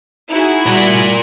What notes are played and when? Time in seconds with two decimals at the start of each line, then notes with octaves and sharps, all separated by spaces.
0.30 D#4 E4 F#4 G#4
0.66 G3 A#4 D5